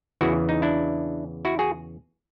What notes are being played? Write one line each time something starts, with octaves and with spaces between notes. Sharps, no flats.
E2 C#3 E3 E4 F#4
D#4
D4 E4
E4 F#4
F#4 G#4